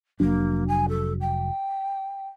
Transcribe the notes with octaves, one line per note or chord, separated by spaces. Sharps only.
F1 F#3 A#3 D4
G#5
A4
G5